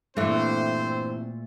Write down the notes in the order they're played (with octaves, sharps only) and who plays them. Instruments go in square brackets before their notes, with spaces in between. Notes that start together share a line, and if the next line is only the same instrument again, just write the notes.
[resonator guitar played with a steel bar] G2 E3 [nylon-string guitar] A#2 A3 [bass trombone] C4 [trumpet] C5